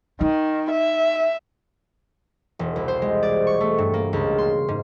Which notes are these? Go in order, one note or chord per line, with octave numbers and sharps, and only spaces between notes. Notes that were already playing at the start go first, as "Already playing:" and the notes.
D#3 D#4
E5
E1
C2
C5
G#3
D5
C#6
A3
G2
A#3
C#2
C6
G#2